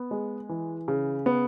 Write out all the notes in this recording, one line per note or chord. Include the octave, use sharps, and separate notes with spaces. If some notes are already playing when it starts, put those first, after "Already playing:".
Already playing: B3
G#3
E3
C#3
B3